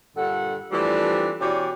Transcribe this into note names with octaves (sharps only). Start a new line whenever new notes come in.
G2 A#2 D3 A4 F#5
E3 F3 G3 A3 C4 D4
B2 E3 C#4 G4 D5